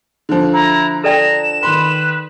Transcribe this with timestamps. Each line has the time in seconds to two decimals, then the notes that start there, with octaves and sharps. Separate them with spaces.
0.29 D3 F3
0.53 E4 A#5
1.04 A4 D5 G5 A#5 E7
1.63 D#3 B4 B5 C6